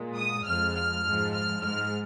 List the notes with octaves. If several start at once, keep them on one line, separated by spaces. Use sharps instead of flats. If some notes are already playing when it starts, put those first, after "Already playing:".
Already playing: A#2 G#3
D#6
F2 F3 G#3 F6
F6
G#2 F3 G#3
F6
G#2 G#3 F6